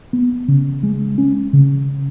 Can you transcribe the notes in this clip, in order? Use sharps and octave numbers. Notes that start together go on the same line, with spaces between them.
B3
C#3
G#3
C#4
C#3